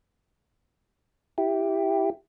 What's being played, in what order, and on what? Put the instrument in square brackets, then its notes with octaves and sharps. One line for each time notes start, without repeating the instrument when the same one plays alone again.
[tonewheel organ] E4 G4